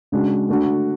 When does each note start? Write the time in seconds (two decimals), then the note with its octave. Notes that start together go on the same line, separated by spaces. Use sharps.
0.12 C#3 G#3 D4 F#4
0.48 D3 A3 D4 F#4